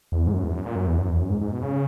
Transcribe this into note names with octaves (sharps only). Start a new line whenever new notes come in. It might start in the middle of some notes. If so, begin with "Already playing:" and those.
E2
G#2
F#2
E2
F#2
A#2
F#2
E2
F#2
E2
F#2
G#2
G#2
B2
C#3